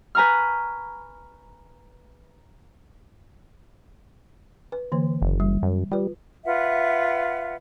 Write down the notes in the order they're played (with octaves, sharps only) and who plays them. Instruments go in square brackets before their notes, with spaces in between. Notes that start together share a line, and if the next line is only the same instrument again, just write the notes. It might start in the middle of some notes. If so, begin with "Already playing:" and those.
[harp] B4 G#5 A#5 C#6 F6
[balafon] B4
D3 E3 A#3
[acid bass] F#1
[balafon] G3
[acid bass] F#2
[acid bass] G3 [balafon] F4 B4
[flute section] F4 B4 E5 F#5